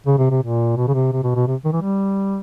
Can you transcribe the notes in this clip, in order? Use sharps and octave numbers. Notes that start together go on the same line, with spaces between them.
C#3
C3
C3
A#2
B2
C#3
C3
C3
B2
B2
C3
D#3
E3
G3